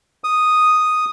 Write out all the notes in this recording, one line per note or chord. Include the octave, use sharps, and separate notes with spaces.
D#6